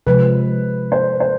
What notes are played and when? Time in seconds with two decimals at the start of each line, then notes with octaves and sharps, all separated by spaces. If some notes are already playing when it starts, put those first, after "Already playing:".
0.06 C3 F3 G#3 B4
0.92 C5
1.20 C5